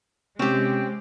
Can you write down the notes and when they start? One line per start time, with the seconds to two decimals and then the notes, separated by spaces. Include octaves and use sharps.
0.39 C3 G#3 C4 C#4 G4